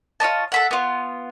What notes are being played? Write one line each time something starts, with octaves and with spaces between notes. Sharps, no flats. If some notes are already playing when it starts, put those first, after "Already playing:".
F4 C#5 D#5 A5
A4 E5 F#5
B3 F4